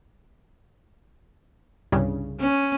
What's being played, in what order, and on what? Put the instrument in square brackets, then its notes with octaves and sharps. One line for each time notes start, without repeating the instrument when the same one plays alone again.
[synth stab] C2 G2 C#3
[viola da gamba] C#4